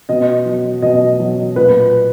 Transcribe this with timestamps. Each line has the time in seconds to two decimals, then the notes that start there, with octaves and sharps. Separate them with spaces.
0.09 B2 D#5
0.46 F#3
0.82 B2 D#5
1.20 F#3
1.56 A#2 B4